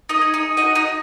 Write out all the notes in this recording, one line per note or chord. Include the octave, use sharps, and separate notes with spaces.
D#4 D#5
G#4
D#4 D#5
D#4 F#4 D#5
D#4 D#5